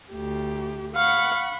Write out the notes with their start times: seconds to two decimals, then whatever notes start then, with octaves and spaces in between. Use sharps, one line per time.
0.12 D2 G4
0.95 F5 F#5 B5 C#6